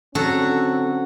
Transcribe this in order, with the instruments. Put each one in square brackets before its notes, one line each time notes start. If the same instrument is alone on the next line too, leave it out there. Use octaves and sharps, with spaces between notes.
[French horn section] D3 C4 C#4 [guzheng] F#3 F#4 A4